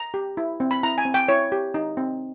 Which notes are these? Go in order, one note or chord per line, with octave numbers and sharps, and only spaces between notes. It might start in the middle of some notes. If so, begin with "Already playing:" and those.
Already playing: A#5
G4
E4
C4
B5
E4 A#5
G#5
C4
G5
E4 C#5
G4
D#4
C4